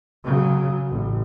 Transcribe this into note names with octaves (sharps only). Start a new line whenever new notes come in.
C#3 F#3
A1